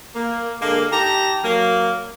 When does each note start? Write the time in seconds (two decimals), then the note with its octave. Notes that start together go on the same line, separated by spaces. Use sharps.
0.15 A#3
0.62 D3 G#3 A#3
0.92 D#4 G4 A5 A#5
1.44 F#3 A#3